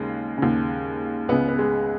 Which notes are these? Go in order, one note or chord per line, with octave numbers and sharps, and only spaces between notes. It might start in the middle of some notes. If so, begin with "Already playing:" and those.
Already playing: D#2 C#3 G#3
D#2 C#3
C#2 C#3 B3
B3
G#3